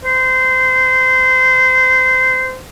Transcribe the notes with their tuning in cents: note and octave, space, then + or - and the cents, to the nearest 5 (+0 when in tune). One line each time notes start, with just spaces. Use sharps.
C5 -25